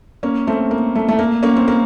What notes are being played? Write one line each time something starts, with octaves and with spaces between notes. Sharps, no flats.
A#3 C#4
A3 C4
A#3
A3
A3
A#3
A#3 C#4
C4
A#3